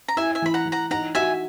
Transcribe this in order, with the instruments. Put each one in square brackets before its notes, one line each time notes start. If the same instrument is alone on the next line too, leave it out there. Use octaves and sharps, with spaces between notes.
[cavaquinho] A#5
[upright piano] E4 [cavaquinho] E5 G#5
[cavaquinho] E5 G#5
[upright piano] E3 [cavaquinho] B5
[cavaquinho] F#5 A#5
[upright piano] E3
[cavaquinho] F#5 A#5
[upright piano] D#4 [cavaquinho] F#5 A#5
[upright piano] F#4 [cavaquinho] E5 G#5